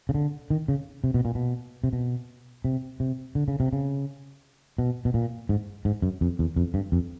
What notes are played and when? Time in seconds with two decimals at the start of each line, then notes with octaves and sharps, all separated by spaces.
0.09 C#3
0.14 D3
0.50 D#3
0.68 C#3
1.04 C3
1.14 B2
1.25 A#2
1.35 B2
1.84 C3
1.93 B2
2.64 C3
3.00 C3
3.35 D3
3.48 C#3
3.60 C3
3.73 C#3
4.78 B2
5.05 B2
5.14 A#2
5.49 G#2
5.85 G#2
6.02 F#2
6.21 F2
6.39 E2
6.56 F2
6.74 G2
6.92 F2